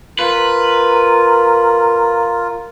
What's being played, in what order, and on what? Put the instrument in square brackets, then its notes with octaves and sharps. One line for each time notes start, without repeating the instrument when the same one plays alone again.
[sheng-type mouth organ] F4 [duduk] A#4 [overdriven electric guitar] B4